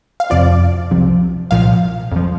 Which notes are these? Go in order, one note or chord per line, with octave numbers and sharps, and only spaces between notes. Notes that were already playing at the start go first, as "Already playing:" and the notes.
F5
F2 C3 F3 D5
C2 C3 F3
C2 A#2 F3 F5
F2 F3